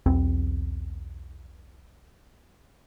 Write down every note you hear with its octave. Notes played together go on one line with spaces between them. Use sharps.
B1 E2 C4